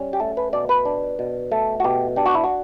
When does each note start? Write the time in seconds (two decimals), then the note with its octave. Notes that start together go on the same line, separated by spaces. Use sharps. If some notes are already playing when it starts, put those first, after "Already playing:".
Already playing: G3 C#4
0.13 G4
0.20 A3 A4
0.37 B4
0.53 B2 D5
0.69 B4
0.85 D4
1.19 B2
1.51 A3 A4
1.80 F#4
1.84 B2 G4
2.16 D4 G4
2.26 F#4
2.35 E4
2.44 F#4